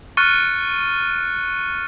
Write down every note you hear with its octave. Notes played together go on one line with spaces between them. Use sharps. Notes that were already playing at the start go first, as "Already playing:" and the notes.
C#6 F6 F#6 A6 C#7 D#7